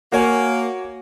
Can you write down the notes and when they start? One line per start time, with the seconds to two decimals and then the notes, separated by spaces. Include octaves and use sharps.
0.12 A#3 F#4 C#5 G#5